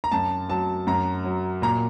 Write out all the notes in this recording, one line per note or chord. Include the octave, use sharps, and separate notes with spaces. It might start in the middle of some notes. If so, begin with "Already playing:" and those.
A#5
F#2 A5
F#3 A5
F#2 A#5
F#3
A#2 A#5